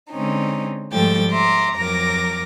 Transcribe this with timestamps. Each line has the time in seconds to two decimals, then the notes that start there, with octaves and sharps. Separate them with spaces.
0.11 D3 G#3 C4 C#4 D#4
0.91 G#2 F3 G3 A3 G5 A6
1.30 E5 A#5 C6 D6
1.74 F2 F#3 A#4 D6 A#6